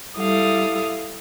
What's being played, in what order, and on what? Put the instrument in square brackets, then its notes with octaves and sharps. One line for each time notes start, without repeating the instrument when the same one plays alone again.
[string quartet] G3 E4 A4 F5 D#6